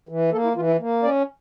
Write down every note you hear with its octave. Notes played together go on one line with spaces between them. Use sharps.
E3
A#3 A4
E4
E3 F4
E4
A#3
C#4 D5